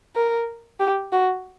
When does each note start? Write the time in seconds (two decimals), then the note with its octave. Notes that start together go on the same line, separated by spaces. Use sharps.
0.16 A#4
0.80 G4
1.12 F#4